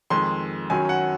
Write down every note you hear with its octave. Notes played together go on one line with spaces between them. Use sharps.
F2 D#3 G#3 C6
F#2 D#3 F#3 C#4 G#5
F#5